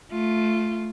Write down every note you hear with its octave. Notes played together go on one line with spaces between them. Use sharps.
A3 F4